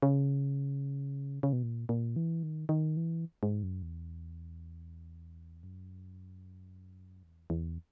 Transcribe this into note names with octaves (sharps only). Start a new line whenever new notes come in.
C#3
C#3
B2
A#2
A#2
E3
D#3
D#3
E3
G#2
F#2
E2
F#2
E2
E2